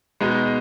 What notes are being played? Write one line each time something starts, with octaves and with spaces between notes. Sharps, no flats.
B2 G#3 B3 D#4